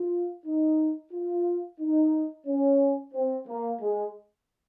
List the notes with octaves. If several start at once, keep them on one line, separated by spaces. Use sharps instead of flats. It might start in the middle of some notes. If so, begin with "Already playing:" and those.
Already playing: F4
D#4
F4
D#4
C#4
C4
A#3
G#3